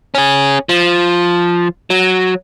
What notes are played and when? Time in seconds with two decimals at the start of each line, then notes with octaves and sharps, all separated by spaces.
0.15 C#4 G#4
0.69 F3
1.90 F#3